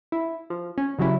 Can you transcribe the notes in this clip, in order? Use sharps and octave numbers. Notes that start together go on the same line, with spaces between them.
E4
F3
C#4
C#3 F#3 G3 C#4 E4